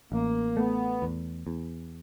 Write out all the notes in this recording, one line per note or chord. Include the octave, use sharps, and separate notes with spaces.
A1 A#3
A3 B3
E2
E2